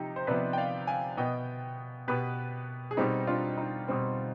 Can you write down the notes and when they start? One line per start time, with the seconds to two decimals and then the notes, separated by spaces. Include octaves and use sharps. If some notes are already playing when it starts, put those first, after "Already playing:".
Already playing: C3 F3 D#4 G4
0.16 C5
0.27 C3 F3 B3 B4 D5
0.53 G5
0.57 D5 F5
0.87 F5 G#5
1.17 B2 B3 D#5 G5
2.08 B2 B3 G4 B4
2.91 G#4
2.97 B2 G3 C4 D#4 G4
3.27 D4 F4
3.57 D#4
3.88 B2 G3 C4